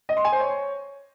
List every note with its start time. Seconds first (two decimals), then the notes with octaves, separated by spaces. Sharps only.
0.09 D#5
0.17 C6
0.25 G#5
0.32 C5
0.40 C#5